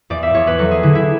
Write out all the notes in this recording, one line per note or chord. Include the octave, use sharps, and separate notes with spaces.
E2 D5
E5
E2 C#5
B4
F#3 A4
G#4
D3 E4
E4